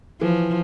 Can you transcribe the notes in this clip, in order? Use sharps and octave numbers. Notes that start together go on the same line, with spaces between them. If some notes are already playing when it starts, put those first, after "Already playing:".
E3 F3